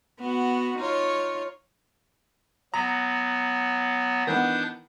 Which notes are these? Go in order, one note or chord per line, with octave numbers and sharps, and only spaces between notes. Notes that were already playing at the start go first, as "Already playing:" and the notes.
B3 F#4
D#4 F4 C#5
F#3 B3 A#5
D#3 E3 B3 D4 D#6 G6